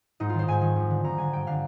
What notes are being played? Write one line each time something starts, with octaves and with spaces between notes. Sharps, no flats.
G#2 D#4
D#3 F4
C5
G#2 G#5
D#3
F2
D3
F2 A#5
D3 G#5
G2 G5
D3 F5